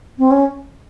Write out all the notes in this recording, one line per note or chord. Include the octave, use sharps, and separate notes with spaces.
C4
C#4